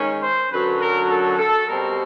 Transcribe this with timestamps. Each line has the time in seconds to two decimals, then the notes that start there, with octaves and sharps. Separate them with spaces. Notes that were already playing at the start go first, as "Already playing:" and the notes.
Already playing: D#3 G#3 C#4
0.22 C5
0.51 F#2 D3 F#3 B4
0.81 A#4
1.10 A4
1.39 A4
1.67 B2 G3 C4 A#4